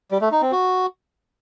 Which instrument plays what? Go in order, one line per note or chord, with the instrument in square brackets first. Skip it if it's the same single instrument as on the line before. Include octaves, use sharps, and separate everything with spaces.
[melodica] G3
A3
D#4
C4
F#4